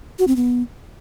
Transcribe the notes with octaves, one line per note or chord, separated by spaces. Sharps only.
F#4
C4
B3